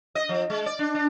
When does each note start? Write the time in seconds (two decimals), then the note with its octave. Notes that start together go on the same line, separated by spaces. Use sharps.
0.15 D#5
0.29 F3
0.50 G#3
0.66 D5
0.79 D4
0.95 D4